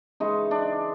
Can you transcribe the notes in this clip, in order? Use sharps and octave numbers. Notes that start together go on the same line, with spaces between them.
C#3 E3 G#3 D#4
D4